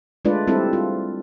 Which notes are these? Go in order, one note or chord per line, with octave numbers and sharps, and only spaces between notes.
G#3 A3 D4 F4 B4 D5
G3 C4 E4 G4 A4
F4